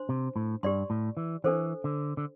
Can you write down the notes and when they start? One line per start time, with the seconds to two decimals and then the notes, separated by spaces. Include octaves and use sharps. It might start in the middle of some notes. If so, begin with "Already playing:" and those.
Already playing: D4 C5 C6
0.09 C3
0.36 A2
0.63 G2 G4 D5 C6
0.90 A2
1.17 E3
1.44 E3 D4 A4 C5
1.84 D3
2.17 D3